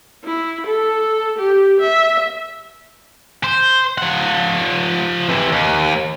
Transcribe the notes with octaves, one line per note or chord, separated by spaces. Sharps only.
E4
A4
G4
E5
C5
F3 F#5
C3 E3
D#2